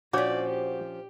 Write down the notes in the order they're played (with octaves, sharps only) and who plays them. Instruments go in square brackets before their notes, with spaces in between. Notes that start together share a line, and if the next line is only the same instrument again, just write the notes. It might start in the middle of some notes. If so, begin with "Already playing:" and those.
[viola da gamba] A#2 D5 [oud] F3 C#4 [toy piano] D4 C#5 D6 [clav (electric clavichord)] F#4
[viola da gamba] G4